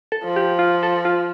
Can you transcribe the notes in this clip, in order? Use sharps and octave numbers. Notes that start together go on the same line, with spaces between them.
A4
F3
G4
F4
A4
F4